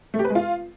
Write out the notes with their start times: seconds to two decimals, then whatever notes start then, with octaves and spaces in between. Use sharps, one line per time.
0.14 A3
0.19 G4
0.24 B4
0.30 G#3
0.35 F4